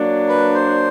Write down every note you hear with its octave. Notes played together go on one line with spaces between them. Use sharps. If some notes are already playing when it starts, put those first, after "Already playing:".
Already playing: F#3 A#3 D4
B4
C5